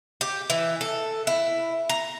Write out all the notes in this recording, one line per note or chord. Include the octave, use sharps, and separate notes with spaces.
G4
E3
A4
E4
A#5